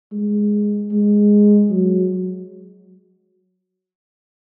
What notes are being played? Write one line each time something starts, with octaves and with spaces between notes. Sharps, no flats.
G#3
G#3
F#3